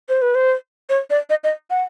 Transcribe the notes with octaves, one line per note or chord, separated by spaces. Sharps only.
C5
B4
C5
C#5
D5
D#5
D#5
F#5